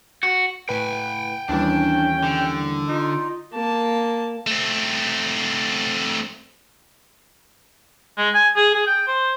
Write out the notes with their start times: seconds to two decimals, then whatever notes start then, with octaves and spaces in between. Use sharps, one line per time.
0.23 F#4
0.69 A2 B4 G5 G#5
1.49 D#2 E3 G3 C#4 D4 G5
2.24 D3
2.88 D#4 F4
3.53 A#3 A5
4.47 A3 C4
8.17 G#3
8.34 G#5
8.56 G#4
8.75 G#4
8.87 G5
9.07 C5